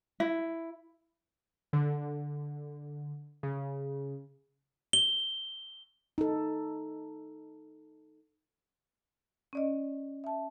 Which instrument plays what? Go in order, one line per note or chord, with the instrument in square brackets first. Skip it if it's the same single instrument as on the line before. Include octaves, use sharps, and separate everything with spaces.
[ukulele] E4
[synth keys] D3
C#3
[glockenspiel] G7
[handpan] D#4 A4
[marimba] C#4 D5 D#5
E5 A5